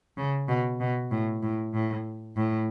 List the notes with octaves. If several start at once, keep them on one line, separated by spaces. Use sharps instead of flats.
C#3
B2
B2
A2
A2
A2
A2